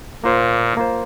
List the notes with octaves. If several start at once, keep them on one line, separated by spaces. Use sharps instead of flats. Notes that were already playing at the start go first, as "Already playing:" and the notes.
A#2 A#3 F4 C5
A#3 F4 C5